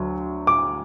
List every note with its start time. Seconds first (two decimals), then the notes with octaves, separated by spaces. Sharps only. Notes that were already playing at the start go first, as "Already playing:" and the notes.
Already playing: D2 F#3
0.47 D6